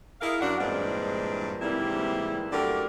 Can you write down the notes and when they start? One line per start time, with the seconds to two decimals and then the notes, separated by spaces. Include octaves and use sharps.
0.21 E4 G#4 A#4 D#5 F5
0.41 F#2 D4 F#5
0.59 G2 A#2 E3 G#3 C4 D4
1.61 G#2 C3 E3 G3 A#3 E4
2.52 F#2 D3 A3 G4 A#4 D5